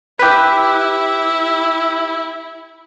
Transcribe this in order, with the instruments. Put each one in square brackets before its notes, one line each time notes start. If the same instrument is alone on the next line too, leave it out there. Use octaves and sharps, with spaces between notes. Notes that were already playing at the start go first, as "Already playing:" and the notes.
[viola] E4 [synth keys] G4 B4